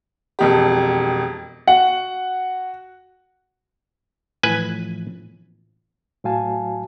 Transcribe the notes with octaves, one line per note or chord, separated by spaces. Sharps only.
E1 F2 G4
F#4 F#5
A2 E3 F3 B4 G#5
A2 F#3 F#4 F5 G#5 A5